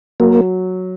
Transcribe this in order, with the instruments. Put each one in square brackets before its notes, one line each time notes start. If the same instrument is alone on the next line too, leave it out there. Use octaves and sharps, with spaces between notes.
[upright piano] F#3 [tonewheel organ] A#3